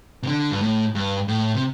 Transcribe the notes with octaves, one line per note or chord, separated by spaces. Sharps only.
C3
D3
G2
A2
G2
A2
C3